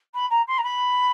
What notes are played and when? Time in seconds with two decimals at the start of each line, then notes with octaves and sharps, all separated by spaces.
0.14 B5
0.30 A#5
0.47 C6
0.58 A#5
0.63 B5